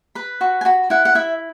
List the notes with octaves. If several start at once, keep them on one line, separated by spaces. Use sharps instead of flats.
B4 B5
F#4 C#6
G#5
F#4 B5
E4 F#5
F#5
E4 E5